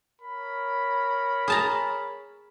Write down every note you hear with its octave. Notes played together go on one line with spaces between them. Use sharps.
A#4 C#5 B5
G#4 A5 A#5